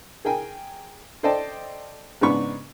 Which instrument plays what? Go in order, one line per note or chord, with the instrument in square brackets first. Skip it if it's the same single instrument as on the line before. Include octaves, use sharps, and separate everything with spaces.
[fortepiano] G#4 A#4 G5 G#5
A4 C5 D5 D#5 G5 A5
G#2 C#3 B3 D4 B5 C#6